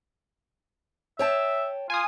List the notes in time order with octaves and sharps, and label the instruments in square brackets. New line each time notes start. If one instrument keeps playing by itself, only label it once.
[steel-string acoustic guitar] C#5 G5 A5 [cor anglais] E5
[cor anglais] F4 [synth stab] G#5 D#6